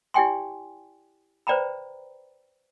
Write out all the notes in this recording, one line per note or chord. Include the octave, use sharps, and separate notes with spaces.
E4 G4 D5 G5 G#5 C6
B4 C5 D5 G5 A#5 B5